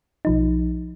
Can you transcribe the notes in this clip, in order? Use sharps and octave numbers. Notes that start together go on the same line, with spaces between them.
B1 F3 D#4